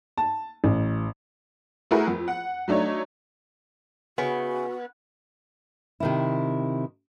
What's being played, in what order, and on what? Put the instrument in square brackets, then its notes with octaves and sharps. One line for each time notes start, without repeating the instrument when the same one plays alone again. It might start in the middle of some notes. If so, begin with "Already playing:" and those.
[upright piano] A5
A1
[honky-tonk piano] A3 E4 F#4 G#4 A#4 B4
F2
F#5
F#3 A3 D4 D#4 C#5
[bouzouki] C#3 E4 G#5 [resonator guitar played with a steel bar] B3 [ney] F#4
[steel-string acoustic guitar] C3 D#3 E4